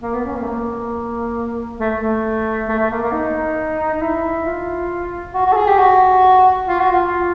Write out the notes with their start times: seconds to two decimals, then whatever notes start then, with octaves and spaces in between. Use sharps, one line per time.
0.02 A#3
0.13 B3
0.25 C#4
0.36 A#3
0.42 A3
0.47 A#3
1.80 A3
1.98 A3
2.68 A3
2.79 A3
2.90 A#3
3.02 A#3
3.12 D#4
3.94 D#4
4.02 E4
4.45 F4
5.34 F#4
5.45 F#4
5.52 A4
5.56 G#4
5.67 G4
5.78 F#4
6.68 F4
6.80 F#4
6.92 F4